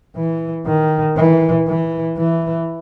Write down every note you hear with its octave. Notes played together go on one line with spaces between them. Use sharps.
E3
D#3
E3
E3
E3